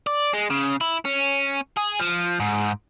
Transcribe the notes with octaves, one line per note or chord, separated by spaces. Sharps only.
D5
G#3
C#3
E4
C#4
G#4
F3
G#2